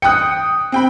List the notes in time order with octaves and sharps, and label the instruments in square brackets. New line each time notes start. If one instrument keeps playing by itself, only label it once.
[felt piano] G5 F#6 [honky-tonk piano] D#6 C#7
[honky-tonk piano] C4 G5 B5